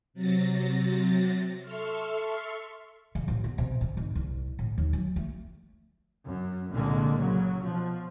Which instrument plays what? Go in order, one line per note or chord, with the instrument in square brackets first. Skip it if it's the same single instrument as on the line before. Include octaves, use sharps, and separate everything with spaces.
[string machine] C3 F#3 A6 A#6
A4 E5 C6 C#6 F6
[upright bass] C#3
A1
B3
C3
G#2
G#1
C2
A2
D#2
F#3
A3
[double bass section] F#2
C2 A#2 D3 G#3 A#3
C#3 F#3
B2 F3